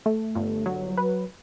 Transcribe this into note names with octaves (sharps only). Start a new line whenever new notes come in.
A3
G1
F#3
B4